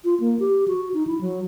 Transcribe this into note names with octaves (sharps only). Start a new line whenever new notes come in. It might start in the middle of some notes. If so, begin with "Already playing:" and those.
F4
A#3
G4
F#4
D#4
E4
F#3